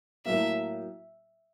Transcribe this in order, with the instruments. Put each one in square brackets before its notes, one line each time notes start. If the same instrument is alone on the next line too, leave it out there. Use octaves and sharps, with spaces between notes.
[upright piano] A2 F#3 A#3 [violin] E5